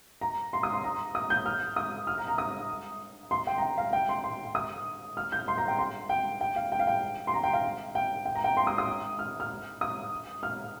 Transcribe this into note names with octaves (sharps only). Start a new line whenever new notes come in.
A#5
C6
D#6
C6
A#5
D#6
G6
F6
D#6
F6
A#5
A#5
D#6
C6
G5
A#5
G5
F5
G5
C6
C6
D#6
F6
G6
C6
A#5
G5
C6
G5
G5
F5
G5
F5
G5
C6
A#5
G5
F5
G5
G5
A#5
G5
C6
D#6
D#6
F6
F6
D#6
F6